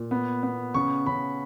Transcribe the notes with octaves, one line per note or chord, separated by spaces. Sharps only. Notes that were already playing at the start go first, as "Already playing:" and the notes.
Already playing: A#2
B3
B3
C#3 C#6
C#3 B5